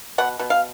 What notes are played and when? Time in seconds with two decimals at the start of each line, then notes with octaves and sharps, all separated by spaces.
0.18 B2 F#5
0.39 B2
0.50 F5